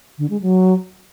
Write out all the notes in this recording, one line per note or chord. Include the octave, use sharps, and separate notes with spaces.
D3
G#3
F#3